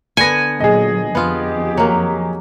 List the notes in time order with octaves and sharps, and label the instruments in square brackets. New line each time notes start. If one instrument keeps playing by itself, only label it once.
[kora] D3 B3 [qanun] G#5 [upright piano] A#6 C#7
[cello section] A#2 F#3 [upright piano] G#4 D#5
[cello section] F2 F3 G4 [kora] B3 F4
[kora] F#3 A#3